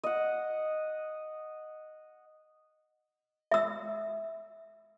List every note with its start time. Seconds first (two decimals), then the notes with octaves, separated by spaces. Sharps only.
0.04 D#5 F#5
3.52 E5 E6